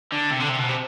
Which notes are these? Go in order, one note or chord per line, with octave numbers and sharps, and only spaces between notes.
D3
C3
D3
C3
B2
C3